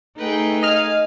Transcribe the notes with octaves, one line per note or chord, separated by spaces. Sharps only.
A3 D#4 G#4 B4 G5
D#5 F5 G#5 F6